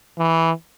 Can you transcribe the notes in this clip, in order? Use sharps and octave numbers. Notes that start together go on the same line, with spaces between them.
E3